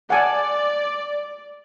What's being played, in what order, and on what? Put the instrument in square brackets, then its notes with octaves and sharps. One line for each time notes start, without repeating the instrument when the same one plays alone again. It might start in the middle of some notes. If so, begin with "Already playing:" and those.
[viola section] D5 [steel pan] F#5 G#5 A5